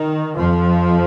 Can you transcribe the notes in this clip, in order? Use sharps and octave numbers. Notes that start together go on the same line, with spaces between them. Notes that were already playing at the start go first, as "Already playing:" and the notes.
Already playing: D#3
F2 F3